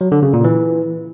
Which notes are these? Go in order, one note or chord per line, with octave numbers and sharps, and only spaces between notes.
F#3
D3
C#3
A#2
E3